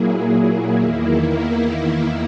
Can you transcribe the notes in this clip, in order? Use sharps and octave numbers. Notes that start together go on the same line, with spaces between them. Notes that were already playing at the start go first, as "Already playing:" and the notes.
Already playing: A#2 F#3 A#3 E4 G#4
E2 D#3 A#3 E4